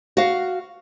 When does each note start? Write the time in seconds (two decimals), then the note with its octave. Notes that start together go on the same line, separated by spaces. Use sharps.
0.17 F#4 F5